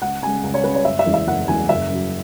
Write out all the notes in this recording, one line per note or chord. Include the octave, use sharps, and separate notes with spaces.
C#2 F#5
C#3 G#3 G#5
C#2
C#5
C#3 G#3 B4
C#5
F#1 E5
E5
E2 E3 G#3
E5
F#1 F#5
E2 E3 G#3 G#5
F#1 E5
F#2 F#3